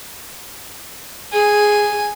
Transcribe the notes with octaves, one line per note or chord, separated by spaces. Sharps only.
G#4 G#5